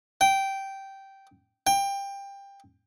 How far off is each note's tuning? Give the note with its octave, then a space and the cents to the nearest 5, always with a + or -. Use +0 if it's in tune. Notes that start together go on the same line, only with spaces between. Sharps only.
G5 -10
G5 +20